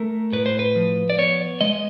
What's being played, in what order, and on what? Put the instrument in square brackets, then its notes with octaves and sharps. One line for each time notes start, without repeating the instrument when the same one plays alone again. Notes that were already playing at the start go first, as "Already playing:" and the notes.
Already playing: [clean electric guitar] A3 A#4
A2 B4
C5
B4
F3
D5
B3 C#5
G#3 D#5